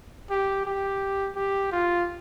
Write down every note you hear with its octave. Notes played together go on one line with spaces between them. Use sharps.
G4
G4
G4
F4